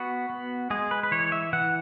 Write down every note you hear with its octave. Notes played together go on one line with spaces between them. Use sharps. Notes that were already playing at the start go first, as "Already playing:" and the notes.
Already playing: B3 F#4
B3
G#3 G#4
B4
B4
E3 C#5
E5
E3 F#5